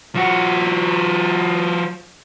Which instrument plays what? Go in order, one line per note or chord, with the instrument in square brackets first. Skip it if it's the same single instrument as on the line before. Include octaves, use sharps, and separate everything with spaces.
[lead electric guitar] F3 F#4